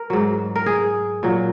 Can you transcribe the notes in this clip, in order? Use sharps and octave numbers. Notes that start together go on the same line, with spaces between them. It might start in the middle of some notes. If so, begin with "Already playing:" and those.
Already playing: A#4
G#2 F#3
A#4
G#4
A#2 F#3